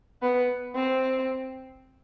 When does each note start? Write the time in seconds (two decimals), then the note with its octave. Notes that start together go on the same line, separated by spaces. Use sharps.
0.22 B3
0.75 C4